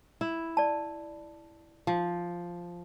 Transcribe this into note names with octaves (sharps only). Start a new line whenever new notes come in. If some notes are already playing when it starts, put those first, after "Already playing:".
E4
D5 A5
F3